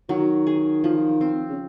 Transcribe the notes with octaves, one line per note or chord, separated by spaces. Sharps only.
D#3 F#3
G#4
F3
C4
C#3